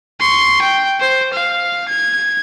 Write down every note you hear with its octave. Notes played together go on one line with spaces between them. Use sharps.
C6 C#6
G5
C5
F5
G#6